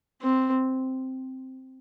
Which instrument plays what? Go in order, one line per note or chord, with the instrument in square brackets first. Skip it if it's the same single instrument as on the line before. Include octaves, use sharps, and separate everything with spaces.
[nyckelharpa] C4